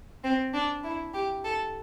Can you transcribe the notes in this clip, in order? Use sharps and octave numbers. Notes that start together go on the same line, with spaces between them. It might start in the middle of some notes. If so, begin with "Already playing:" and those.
C4
D4
E4
G4
A4